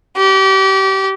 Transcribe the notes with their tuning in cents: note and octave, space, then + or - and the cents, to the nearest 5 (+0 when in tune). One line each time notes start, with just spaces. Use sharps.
G4 -30